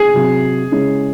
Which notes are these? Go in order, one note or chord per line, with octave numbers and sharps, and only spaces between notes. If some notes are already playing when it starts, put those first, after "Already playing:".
Already playing: G#4
C3 F#3 C4
C#3 G#3 C#4 E4